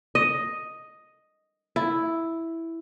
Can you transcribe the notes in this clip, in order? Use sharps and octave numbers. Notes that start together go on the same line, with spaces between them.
D#5
E4